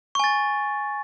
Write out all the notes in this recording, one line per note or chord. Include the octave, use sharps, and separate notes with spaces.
G#5 C#6 A6